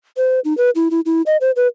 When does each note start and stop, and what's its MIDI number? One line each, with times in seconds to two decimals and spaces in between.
0.17 0.40 72
0.45 0.56 63
0.58 0.70 71
0.75 0.88 64
0.91 1.00 64
1.06 1.22 64
1.26 1.37 75
1.41 1.51 72
1.56 1.67 71